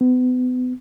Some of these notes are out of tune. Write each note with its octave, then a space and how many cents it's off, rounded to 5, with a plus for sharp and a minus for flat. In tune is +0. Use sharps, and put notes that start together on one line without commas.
B3 +35